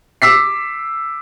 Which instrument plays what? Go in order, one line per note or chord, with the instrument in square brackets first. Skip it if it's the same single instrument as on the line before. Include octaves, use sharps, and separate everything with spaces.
[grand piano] D6 E6 B6 C7